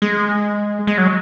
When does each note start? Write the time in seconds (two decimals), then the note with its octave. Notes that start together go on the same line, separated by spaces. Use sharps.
0.02 G#3
0.87 G#3
0.98 F#3